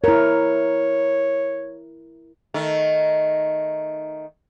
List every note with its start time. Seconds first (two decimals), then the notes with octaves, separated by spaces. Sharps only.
0.04 E4 A#4 C#5
2.54 D#3 A3